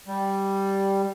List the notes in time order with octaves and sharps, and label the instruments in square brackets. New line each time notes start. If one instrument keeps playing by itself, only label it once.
[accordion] G3